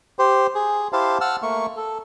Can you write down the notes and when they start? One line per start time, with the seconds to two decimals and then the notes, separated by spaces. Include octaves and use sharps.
0.19 G4 C5
0.55 G#4
0.93 E4 G4 C5 F5 A5
1.21 F#5 A5 E6 F6
1.42 A3 A#3 C#6
1.77 A4